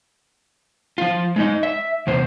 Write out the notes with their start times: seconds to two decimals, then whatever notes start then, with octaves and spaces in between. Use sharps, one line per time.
0.98 F3 F4
1.36 G#3 D#4 D#5
1.63 E5
2.07 E2 C3 C5